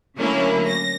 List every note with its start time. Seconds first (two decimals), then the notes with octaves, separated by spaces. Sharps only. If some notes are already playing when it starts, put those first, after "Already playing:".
0.16 D3 F#3 A3 A#3 C#4 E4
0.68 A#6